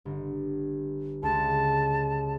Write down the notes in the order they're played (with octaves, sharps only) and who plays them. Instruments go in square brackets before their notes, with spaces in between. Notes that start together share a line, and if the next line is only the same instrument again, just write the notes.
[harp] G1
[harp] C#2 [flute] A5